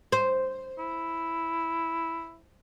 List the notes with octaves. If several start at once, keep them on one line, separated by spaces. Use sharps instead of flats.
C5
E4